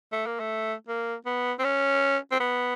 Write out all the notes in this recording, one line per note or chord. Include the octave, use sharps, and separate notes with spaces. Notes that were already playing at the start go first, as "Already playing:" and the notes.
A3
A#3
A3
A#3
B3
C4
C#4
C4
B3